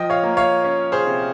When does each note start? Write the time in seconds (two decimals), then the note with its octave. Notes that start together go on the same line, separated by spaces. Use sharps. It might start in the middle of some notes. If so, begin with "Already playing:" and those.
Already playing: F3 D#5 G5
0.10 C#5 F5
0.23 A#3
0.37 C#5 F5
0.64 C#4
0.92 G#4 C5
1.06 C3